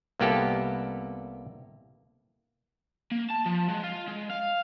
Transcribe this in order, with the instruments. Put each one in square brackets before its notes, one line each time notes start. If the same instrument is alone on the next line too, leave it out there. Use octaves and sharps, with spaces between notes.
[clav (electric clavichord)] C2 A#3 B3 G4 A4
[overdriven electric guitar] A#3
A5
F3
G#3
F4
G#3
F5